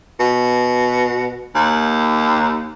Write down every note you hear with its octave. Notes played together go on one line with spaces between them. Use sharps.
B2
D#2